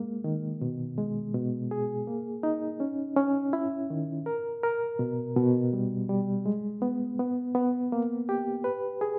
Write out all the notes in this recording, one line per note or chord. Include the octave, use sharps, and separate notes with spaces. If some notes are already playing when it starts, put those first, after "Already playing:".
Already playing: G#3 A#3
D#3
B2
G#3
B2
G#4
A#3
D#4
C#4
C#4
E4
D#3
A#4
A#4
B2
B2
G3
G3
G#3
B3
B3
B3
A#3
G4
B4
G#4